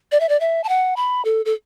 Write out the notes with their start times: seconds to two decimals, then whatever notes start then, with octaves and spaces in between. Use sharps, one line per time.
0.12 D5
0.20 E5
0.29 D5
0.40 E5
0.64 A5
0.69 F#5
0.96 B5
1.25 A4
1.45 A4